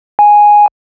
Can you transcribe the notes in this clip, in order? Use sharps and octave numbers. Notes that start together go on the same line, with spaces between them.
G#5